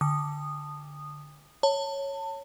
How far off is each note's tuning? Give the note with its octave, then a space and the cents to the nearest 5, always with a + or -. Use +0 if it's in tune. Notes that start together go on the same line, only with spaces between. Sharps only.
D3 +0 D#6 -15
C#5 +0 A5 +30